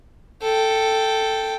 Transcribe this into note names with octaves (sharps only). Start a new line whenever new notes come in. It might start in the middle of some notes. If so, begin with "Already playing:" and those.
A4 G5